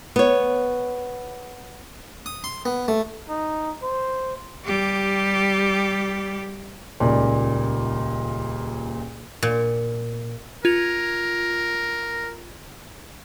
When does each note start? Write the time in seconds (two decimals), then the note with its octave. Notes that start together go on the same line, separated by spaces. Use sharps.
0.16 B3 C#5
2.26 D#6
2.44 C6
2.65 B3
2.88 A3
3.29 D#4
3.83 C5
4.64 G3 G4
7.00 D#1 C#2 A#2 D5
9.43 A#2
10.65 F4 A#4 G#6 F7